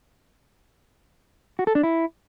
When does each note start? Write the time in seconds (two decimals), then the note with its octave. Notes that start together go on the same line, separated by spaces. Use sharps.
1.59 F#4
1.67 A4
1.75 D4
1.83 E4